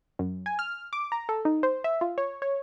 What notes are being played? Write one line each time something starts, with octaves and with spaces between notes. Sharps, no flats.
F#2
G#5
F6
D6
A#5
A4
D#4
C5
E5
F4
C#5
C#5